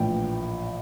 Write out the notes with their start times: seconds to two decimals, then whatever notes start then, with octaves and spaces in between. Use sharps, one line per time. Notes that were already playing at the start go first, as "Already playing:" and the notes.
Already playing: A#1 A2 E3 G5